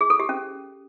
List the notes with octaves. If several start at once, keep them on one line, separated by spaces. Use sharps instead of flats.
G#4
A4
G4
C#4